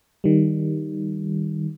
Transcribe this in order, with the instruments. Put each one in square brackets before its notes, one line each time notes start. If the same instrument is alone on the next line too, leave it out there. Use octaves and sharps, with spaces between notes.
[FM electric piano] D#3 G3